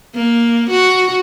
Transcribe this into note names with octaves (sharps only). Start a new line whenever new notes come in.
A#3
F#4